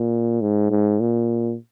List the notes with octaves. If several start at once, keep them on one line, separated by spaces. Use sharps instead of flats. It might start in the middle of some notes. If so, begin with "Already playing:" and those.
Already playing: A#2
G#2
G#2
A#2